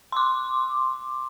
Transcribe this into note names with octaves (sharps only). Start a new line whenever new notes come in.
C6 D6